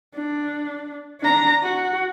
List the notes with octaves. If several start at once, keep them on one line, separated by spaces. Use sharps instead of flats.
D4
D4 A#5
F#4